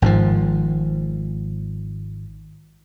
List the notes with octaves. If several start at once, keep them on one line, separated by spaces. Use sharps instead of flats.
G#1 G#2 C#3 F3